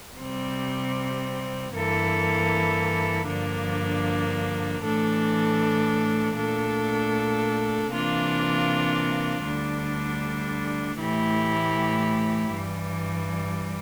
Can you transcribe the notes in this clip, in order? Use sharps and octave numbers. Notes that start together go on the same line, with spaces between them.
C3 G3 C4
G2 E3 A#3 E4 A4
G2 D3 F3 A#3 D4
A2 E3 A3 D4 A4
A#2 A3 D4 A4
C3 E3 A#3 D4 F4
D2 D3 G3 D4
A2 E3 A3 E4 G4
G2 E3 G3